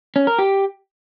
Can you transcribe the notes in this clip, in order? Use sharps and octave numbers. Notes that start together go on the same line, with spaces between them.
C#4
A#4
G4